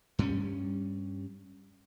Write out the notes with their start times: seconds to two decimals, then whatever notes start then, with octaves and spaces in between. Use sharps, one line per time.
0.19 G2 G3 C#4